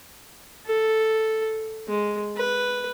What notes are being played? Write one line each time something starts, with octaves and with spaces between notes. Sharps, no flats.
A4
G#3
B4